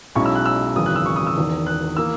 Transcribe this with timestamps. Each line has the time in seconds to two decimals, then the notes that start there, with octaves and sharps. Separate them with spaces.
0.15 B1 B2 G#3 C#4 E4 C#6
0.26 E6
0.35 F#6
0.46 E6
0.76 G#1 F#2 C#3 E3 D#6
0.86 F#6
0.96 E6
1.06 C#6
1.16 D#6
1.27 E6
1.37 E1 E2 D#3
1.66 F#6
1.97 E3 A#3 E6